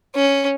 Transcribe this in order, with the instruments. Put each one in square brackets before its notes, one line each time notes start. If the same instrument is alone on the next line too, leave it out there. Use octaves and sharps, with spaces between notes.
[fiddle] C#4